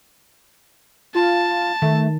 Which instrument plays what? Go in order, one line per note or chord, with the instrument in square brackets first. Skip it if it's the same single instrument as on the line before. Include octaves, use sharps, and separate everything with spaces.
[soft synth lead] F4 [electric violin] A5
[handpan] D#3 [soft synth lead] A3